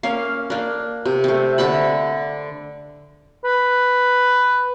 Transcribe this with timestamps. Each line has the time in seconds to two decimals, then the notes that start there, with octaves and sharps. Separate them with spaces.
0.03 A#3 C#4 F5
0.50 A#3 D4
1.05 C3
1.24 A3 C4
1.58 D3 E5 A5 B5
3.45 B4